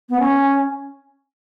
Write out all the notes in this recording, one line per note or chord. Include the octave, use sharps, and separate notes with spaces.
B3
C#4